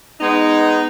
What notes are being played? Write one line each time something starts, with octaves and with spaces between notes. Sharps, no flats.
G#3 B3 D#4